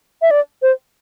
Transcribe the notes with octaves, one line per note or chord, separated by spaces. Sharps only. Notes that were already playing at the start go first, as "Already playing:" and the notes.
E5
D5
C5